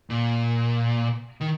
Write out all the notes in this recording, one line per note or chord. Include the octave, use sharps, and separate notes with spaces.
A#2
D#3